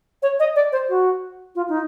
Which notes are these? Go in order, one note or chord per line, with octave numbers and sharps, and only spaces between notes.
C#5
D#5
D5
C5
F#4
F4
D#4